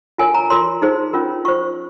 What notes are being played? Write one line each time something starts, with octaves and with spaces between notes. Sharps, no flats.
F4 A#4 C#5 G#5
A#5
F4 A#4 C#5 C6
D#4 G#4 C5
C#4 F4 A#4
F4 C5 C#6